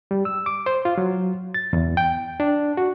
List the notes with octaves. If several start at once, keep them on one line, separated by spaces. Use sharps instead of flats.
G3
E6
D6
C5
F4
F#3
A6
E2
G5
D4
F#4